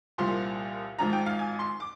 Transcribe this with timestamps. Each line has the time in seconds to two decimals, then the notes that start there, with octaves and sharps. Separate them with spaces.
0.18 C2 A#2 F3 C6
0.98 G#1 G#2 F3 A#5
1.13 G5
1.26 F5
1.39 G#5
1.59 C6
1.80 D6